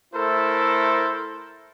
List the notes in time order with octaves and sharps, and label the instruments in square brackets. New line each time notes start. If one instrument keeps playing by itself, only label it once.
[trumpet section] A3 E4 A4 A#4 C5